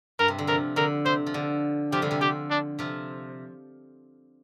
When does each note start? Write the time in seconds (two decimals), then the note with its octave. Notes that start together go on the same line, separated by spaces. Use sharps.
0.19 G2 A#4
0.28 C3
0.38 D3
0.47 C3 F3 A#4
0.76 D3 A#4
1.06 C3 C5
1.26 F3
1.34 D3
1.92 C3 F3 G4
2.02 D3 G3
2.11 C3 F3
2.21 D3 G4
2.50 D4
2.79 C3 F3